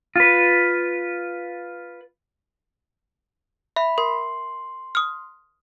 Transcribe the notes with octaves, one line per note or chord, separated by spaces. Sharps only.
F4 B4
E5 B5
A#4 C6
D#6 F6